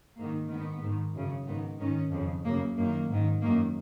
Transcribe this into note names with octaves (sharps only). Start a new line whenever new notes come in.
G#2 D#3 A#3
G#2 D#3 B3
G#2 D#3
F#2 C#3
G#2 D#3 B3
G#2 D#3 C#4
F2 C#3
F#2 C#3 A#3
F#2 D#3 A#3
G#2 D#3
F#2 D#3 A#3